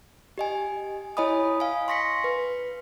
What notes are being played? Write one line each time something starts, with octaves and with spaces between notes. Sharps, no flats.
G4 D#5 G#5
E4 C#5 D#5 G#5 B5 D#6
F5 G#5
C6 C#6 A#6 B6 C#7
B4